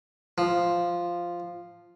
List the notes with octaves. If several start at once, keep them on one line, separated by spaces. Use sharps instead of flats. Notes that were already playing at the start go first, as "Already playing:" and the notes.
F3